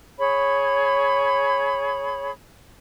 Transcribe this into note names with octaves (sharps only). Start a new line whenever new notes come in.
G#4 C#5 B5